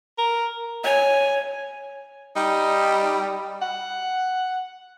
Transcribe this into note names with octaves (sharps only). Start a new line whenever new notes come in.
A#4
C#5 G#5
G3 D#4
F#5